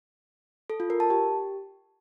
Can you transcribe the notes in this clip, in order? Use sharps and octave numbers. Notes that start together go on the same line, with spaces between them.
A4
F4
A#4
A5
G4